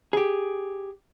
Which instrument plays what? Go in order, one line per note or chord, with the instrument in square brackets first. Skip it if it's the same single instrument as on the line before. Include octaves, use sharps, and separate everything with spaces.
[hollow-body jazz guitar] G4 G#4